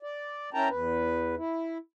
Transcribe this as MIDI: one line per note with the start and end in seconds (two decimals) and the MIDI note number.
0.02 0.50 74
0.54 0.68 61
0.54 0.68 64
0.54 0.68 70
0.54 0.68 79
0.54 0.68 81
0.54 0.68 82
0.69 1.35 40
0.69 1.35 71
1.37 1.78 64